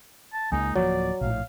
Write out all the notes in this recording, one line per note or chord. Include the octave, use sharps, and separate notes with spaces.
A5
C#2 G#3 A#3 D#4 G#5
D1 F3 F#3 A#3 C#5 D5
A#1 A2 F5